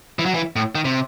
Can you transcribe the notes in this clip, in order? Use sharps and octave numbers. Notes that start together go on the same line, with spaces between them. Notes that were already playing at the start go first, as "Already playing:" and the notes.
E3
F#3
E3
A2
D#3
C3